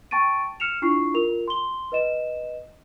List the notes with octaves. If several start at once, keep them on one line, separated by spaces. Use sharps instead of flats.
G5 A5 C#6 A6 D7 D#7
F6 C#7 E7 F7
D4 E4 F4 C#6 C7
F4 A#4 F7
C6 G7
B4 D#5 E7